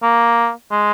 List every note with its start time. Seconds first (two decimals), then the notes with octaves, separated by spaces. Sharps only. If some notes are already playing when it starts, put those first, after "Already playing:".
0.03 A#3
0.71 G#3